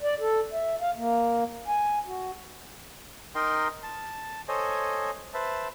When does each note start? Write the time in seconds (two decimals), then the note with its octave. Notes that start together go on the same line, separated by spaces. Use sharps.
0.01 D5
0.20 A4
0.53 E5
0.81 F5
0.96 A#3
1.67 G#5
2.06 F#4
3.35 D#4 A#4 D#5 G5 C6
3.83 A5
4.48 A4 C5 C#5 D#5 G#5
5.34 B4 C5 E5 A5